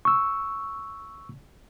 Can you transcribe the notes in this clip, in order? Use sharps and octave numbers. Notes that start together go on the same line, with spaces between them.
C#6 E6